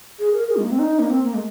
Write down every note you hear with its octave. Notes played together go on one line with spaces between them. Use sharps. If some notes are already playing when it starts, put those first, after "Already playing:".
G#4
A#4
G#4
G#3
A#3
C4
D#4
A#3
C4
A#3
G#3